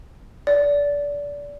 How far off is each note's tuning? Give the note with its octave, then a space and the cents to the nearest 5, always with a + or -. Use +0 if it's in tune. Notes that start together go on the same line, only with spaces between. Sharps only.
D5 -25